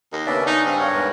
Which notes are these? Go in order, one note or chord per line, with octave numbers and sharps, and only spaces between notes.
D#2 D#5
C#3 B3 C#4 D4 D5 E5
D#4 F#5
G2 C4 F5
A#4 C#5 F#5
E2 G#2 E3